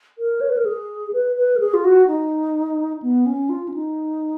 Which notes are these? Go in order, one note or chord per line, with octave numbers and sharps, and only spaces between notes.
A#4
C#5
B4
A#4
G#4
B4
B4
A#4
G#4
F4
F#4
D#4
B3
C#4
F4
C#4
D#4